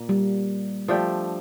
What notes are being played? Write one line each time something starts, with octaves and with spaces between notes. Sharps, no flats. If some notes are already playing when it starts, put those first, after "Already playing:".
Already playing: A#2 A#3
G3
F3 A3 D4 G4